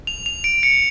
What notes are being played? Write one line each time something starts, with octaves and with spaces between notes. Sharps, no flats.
F7
F7
D7
C#7